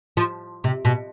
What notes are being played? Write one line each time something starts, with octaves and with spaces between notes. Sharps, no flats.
F3
C3
B2